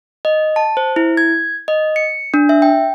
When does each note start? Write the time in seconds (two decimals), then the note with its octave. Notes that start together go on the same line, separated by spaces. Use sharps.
0.25 D#5
0.56 A5
0.77 C5
0.96 E4
1.17 G#6
1.68 D#5
1.96 C#7
2.34 D4
2.49 E5
2.62 G5